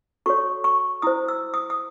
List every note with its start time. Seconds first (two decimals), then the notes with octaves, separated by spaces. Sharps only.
0.26 F#4 A4 C#5 C#6
0.64 C#6
1.02 E4 C5 D#6
1.28 E6
1.54 D#6
1.70 D#6